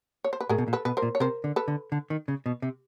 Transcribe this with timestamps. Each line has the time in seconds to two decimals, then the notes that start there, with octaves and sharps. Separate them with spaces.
0.24 C#5
0.33 C5
0.41 B4
0.49 A2 G#4 A#4
0.58 B2
0.68 A#2
0.73 A4 B4
0.85 B2 B4
0.97 A#4 C5
1.02 A#2
1.15 C#5
1.20 C3 A#4 C5
1.44 D3
1.56 A4 B4
1.68 D3
1.92 D3
2.10 D#3
2.28 C#3
2.46 B2
2.62 C3